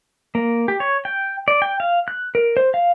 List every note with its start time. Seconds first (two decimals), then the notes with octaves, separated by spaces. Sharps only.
0.35 A#3
0.68 G4
0.80 C#5
1.05 G5
1.48 D5
1.62 G5
1.80 F5
2.08 F#6
2.35 A#4
2.57 C5
2.74 F5